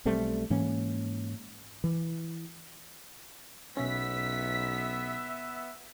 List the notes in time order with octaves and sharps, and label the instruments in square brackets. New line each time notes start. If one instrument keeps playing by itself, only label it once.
[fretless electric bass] B1 G3 A3 C4
G#2 E3 A#3 C#4
E3
[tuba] B1 [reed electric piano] B2 C#4 [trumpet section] B3 E5 [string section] B6